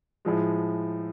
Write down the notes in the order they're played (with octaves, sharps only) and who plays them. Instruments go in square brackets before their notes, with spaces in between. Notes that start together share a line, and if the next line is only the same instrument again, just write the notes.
[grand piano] A2 F3 G#3